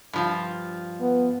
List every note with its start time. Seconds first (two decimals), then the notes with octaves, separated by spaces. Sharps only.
0.13 G2 F3 F4
1.01 B3